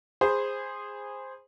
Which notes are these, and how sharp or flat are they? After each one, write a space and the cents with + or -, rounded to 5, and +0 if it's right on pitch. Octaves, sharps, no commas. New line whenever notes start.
G#4 -15 C5 +0 B5 -10